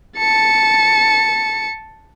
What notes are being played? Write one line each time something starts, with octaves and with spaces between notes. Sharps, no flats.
A5 C#7